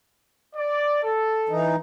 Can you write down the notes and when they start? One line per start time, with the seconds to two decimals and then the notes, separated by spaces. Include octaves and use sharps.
0.56 D5
1.04 A4
1.49 E3 D#4